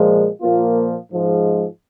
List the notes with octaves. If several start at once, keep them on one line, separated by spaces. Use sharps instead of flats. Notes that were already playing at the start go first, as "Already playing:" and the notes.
Already playing: A#2 F3 G#3
A#2 F3 A#3 F4
G#2 F3 G#3